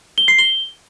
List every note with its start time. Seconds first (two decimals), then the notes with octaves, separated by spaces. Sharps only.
0.18 G7
0.28 C7
0.39 G7